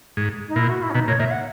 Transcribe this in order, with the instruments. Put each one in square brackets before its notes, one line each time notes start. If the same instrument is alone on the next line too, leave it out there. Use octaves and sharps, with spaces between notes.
[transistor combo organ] G#2
[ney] D#4
[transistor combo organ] A#2 [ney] E4
[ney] F#4
E4
C#4
[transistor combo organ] B2 [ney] D#4
[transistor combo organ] A#2 [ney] C#5
[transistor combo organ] A#2 [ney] E5
[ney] F#5